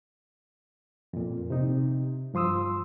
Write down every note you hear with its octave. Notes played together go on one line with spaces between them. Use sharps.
F2 A#2
C3 D#4
G2 F3 C6 D#6 E6